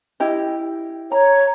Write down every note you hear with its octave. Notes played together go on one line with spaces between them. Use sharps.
E4 G4 D#5
C#5 A#5